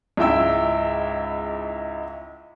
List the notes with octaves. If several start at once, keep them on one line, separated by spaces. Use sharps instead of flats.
C#2 G#2 E4 E5 G5 E6